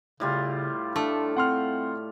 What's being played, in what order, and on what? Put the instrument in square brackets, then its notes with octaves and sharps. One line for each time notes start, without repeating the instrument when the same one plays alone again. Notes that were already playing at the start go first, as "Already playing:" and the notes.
[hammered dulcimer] A2 G3 F4 [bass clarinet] C#3
[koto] A3 [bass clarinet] D4
[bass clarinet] C4 [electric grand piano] F#5 C6 F6